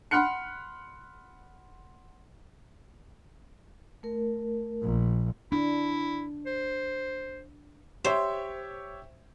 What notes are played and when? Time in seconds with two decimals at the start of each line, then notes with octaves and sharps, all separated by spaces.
0.11 F#5 B5 C6 F6 F#6 C#7
4.03 A3 A#4
4.82 A#1
5.52 D4 E4
6.46 C5
8.04 G4 C5 C#5 E5